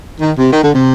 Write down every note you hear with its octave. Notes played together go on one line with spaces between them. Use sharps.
D#3
C3
D#3
D3
C3